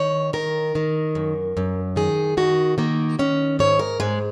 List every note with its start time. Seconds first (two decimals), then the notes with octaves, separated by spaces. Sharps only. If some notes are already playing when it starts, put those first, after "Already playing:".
Already playing: D#3 C#5
0.33 D#3 A#4
0.75 D#3
1.15 F#2
1.57 F#2
1.96 D#3 G#4
2.37 D#3 F#4
2.78 D#3 A#3
3.19 D#3 C#4
3.59 G#2 C#5
3.79 A#4
4.00 G#2 G#3